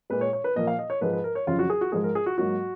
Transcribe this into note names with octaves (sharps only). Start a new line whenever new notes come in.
A#2 G#3 B4
C#5
C#5
B4
A#2 F3 A#3 D#5
F5
D#5
C#5
G#2 F3 G#3 B4
B4
A#4
C#5
F2 C#3 F#3 F4
F#4
G#4
F#4
G#2 F3 G#3 G#4
A#4
G#4
F#4
G#2 F#3 A#3 F#4